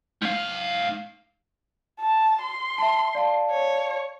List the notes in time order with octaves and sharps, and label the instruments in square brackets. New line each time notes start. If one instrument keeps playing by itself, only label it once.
[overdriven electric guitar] G#2 F5
[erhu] A5
C6
[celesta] E5 A5
D5 F5 A5
[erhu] C#5